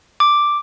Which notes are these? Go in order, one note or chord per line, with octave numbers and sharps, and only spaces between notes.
D6